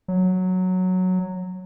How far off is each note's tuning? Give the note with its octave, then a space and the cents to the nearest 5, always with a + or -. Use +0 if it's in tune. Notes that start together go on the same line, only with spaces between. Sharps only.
F#3 -5